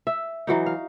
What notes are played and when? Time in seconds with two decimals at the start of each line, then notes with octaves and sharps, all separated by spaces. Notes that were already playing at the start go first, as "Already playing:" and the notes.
0.07 E5
0.47 E3 F#3 D#4
0.66 F5